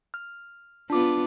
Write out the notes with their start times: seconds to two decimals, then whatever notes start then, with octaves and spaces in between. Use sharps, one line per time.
0.14 F6
0.90 B3 D4 F4 D6